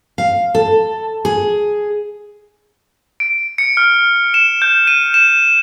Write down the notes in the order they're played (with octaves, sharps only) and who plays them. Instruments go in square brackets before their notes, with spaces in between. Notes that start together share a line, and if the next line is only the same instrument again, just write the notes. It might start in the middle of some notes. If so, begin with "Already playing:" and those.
[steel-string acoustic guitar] F5
A4
G#4
[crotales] D7
C#7
F6
E7
G6
D#7
E7